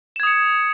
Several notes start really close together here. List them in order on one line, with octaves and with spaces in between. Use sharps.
E7 G#6 D#6 C#7